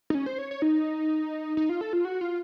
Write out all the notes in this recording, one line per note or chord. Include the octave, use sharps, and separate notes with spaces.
D#4
C#4
C5
C#5
C#5
D#4
D#4
F4
A4
F4
F#4
F4